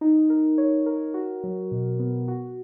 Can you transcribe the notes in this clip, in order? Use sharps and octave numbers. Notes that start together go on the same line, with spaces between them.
D#4
A#4
C#5
A#4
F#4
F#3
B2
B3
F#4